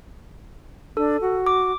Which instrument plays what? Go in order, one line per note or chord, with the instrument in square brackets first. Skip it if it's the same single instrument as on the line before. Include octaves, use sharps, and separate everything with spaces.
[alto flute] D4 [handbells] A4
[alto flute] F#4
[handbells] D6